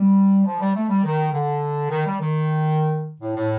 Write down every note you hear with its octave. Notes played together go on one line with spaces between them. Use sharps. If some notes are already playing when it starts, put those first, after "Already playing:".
Already playing: G3
F3
G3
A3
G3
D#3
D3
D#3
G3
D#3
A2
A2